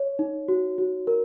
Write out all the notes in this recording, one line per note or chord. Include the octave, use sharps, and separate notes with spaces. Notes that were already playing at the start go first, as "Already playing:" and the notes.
Already playing: C#5
D#4
F#4
F#4
A#4